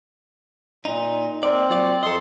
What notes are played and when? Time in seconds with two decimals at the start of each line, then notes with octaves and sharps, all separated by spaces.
0.85 A#2 D#4
1.43 A#3 C4 D5
1.70 F#3 F4 D5
2.03 F2 A4 D#5 C6